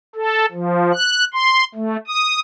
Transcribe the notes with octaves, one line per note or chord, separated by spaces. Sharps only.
A4
F3
F#6
C6
A3
D#6